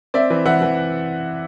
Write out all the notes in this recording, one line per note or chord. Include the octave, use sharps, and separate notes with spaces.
C4 D5 E5
E3
E3 E5 F#5
E3